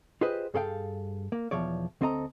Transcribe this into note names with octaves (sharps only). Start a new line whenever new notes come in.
F4 G4 G#4 B4 C5 D#5
G2 G#4 A4 F5 G5
A#3
B1 E2 F3 C#5 D5
D2 C4 A4 D#5 A#5